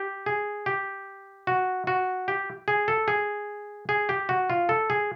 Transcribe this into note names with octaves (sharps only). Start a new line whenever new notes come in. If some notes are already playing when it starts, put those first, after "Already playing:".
Already playing: G4
G#4
G4
F#4
F#4
G4
G#4
A4
G#4
G#4
G4
F#4
F4
A4
G#4